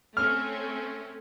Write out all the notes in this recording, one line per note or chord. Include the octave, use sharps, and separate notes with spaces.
A3 C4 C#4 F6